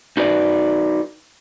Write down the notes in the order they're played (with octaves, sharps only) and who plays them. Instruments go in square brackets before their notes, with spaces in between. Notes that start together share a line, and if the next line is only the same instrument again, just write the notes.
[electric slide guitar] D#4 F#4 B4 D5